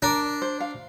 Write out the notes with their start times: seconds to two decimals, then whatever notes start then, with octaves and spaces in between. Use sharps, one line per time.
0.02 D4 A#4
0.42 C5
0.60 F5